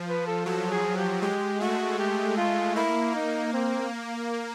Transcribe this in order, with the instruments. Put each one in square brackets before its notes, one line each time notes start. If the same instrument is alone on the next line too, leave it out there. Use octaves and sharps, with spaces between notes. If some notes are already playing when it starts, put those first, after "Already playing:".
Already playing: [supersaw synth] F3
[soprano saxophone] B4
A4
[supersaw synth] F#3 [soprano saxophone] A4
[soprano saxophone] G#4
G4
[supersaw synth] G#3 [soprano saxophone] G4
[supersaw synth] A3 [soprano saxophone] F#4
[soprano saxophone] G4
F4
[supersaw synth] A#3 [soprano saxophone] E4
[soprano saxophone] D#4
C4